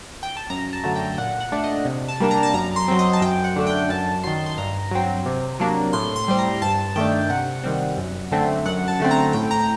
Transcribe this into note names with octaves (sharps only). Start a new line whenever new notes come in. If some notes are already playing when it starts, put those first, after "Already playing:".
G5
A5
F#2 A#5
A5
D3 F#3 A3
G5
A#2 F#5
F#5
A3 D4
D#5
C3
A5
G3 A#3 D4
A#5
A5
F#2 A#5
C6
F#3 C4
D#5
A5
F#2 G5
F#5
D3 A3 D4
G5
F#2 A5
D#3 F#3 C6
C6
G2 A#5
F#3 C4
C3
F#3 A#3 D4
A2 C6
C6
G3 C4
A#5
G2 A5
D#3 A3 D4 G5
C3 F#5
D#3 G3 C4
F#2
D3 A3 C4
F#2 F#5
A5
D3 A3 C4
A#5
A2 G5
A#5